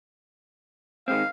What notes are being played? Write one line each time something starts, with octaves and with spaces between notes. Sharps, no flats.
D#3 G#3 C4 F5